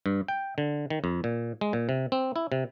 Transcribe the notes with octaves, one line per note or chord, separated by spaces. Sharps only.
G2
G5
D3
D#3
F2
A#2
G#3
A#2
C3
C4
E4
C3